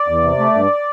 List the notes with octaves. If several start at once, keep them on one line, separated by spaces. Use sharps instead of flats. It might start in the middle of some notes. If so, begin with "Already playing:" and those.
Already playing: D5
E2
C3
A3
G2